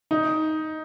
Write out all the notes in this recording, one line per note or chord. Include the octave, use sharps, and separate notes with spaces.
D#4